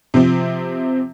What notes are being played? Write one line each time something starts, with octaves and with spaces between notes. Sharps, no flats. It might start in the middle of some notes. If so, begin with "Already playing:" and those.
C3 F3 C4